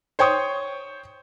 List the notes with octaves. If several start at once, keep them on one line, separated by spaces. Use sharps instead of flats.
C5 C#5 G5 C#6 D#6